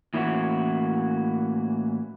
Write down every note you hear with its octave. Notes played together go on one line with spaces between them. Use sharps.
A2 E3 A#3 C#4 E4 F#4